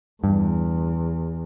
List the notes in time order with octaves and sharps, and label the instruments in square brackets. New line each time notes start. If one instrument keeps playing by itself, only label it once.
[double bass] E2 [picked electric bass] G2